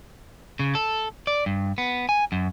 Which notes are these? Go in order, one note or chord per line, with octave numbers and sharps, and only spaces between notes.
C#3
A4
D5
G2
B3
G#5
F#2